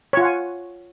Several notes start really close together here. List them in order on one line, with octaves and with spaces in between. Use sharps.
C#5 F4 F#5 G#5